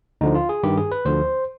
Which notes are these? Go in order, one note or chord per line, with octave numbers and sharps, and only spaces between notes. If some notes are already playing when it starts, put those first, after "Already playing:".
D2 D3 F3 D#4
F4
G#4
G2 D#3 G4
G#4
B4
D2 D3 F3 C5